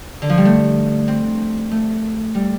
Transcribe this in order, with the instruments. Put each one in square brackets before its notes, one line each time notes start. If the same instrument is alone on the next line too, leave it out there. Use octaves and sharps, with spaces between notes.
[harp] D3
F3
G3
A3
C4
A3
G3